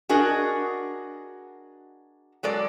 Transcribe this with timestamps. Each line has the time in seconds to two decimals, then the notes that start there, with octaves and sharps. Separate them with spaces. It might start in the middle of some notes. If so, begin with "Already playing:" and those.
0.09 D4 F#4 G#4 A#4 D#5
2.43 F#3 G#3 A4 D5